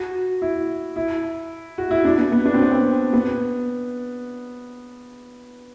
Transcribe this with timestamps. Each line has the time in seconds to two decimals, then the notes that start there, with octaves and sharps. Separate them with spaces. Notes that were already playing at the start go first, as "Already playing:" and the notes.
Already playing: F#4
0.42 E4
0.96 E4
1.78 F#4
1.91 E4
2.05 D4
2.18 B3
2.32 B3
2.45 D4
2.54 C4
2.62 B3
2.71 C4
3.13 B3